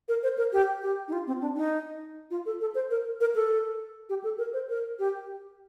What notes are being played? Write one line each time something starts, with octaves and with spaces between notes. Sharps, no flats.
A#4
C5
A#4
G4
G4
D#4
F4
C4
D4
D#4
F4
A4
A4
C5
A#4
A#4
A4
G4
A4
A#4
C5
A#4
G4